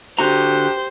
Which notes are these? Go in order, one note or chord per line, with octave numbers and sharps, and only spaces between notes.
D3 F#4 G4 C5 A#5